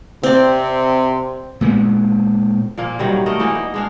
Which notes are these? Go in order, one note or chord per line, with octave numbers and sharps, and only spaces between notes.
C3 C4 D5
A#2 G#3 B3
A#2 F3 A#3
C3 D#3 F#3 G3
A3 A#4 D#5
E3 A#3 B3 D#4
D#4
G#3 D4 F5